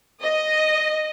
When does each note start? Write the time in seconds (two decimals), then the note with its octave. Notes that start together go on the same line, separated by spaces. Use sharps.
0.21 D#5